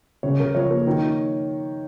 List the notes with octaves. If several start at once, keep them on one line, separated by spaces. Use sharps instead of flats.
C#3 C#5
C#3 A#4
F3 C#5
A#3
D#3